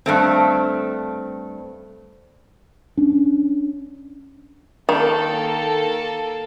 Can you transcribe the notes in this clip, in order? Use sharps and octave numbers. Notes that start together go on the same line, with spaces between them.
G2 A3 C4
C#4 D4
D#3 A#3 A4